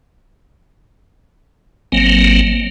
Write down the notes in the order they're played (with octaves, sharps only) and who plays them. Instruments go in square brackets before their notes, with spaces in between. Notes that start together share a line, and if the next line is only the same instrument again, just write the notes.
[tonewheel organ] G#1 F#3 A#3 C4